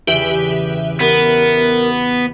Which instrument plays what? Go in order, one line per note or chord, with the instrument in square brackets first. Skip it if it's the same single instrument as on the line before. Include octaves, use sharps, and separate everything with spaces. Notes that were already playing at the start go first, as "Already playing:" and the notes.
[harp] E2 C#3 [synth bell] G4 B4 E5
[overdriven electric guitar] B3 [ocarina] A#4